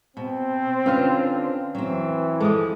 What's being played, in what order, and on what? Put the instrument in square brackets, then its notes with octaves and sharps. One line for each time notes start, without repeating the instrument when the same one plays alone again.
[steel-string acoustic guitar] B2 [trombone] C4
[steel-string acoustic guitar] D3 D4 F4 [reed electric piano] C#4 B4 F6
[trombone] E3 [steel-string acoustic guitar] F#3 C4
[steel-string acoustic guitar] F3 G#3 [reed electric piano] A4 D6 D#6